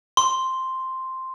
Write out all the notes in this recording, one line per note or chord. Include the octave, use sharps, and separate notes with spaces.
C6